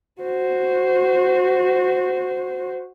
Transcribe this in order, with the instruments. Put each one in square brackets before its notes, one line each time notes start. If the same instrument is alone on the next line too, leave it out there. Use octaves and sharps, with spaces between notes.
[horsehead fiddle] F#4 C5